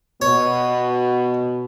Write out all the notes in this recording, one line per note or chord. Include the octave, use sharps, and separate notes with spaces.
B2 C#5